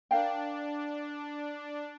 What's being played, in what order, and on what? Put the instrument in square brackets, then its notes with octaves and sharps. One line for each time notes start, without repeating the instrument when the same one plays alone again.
[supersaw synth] D4 [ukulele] A#4 F5 G5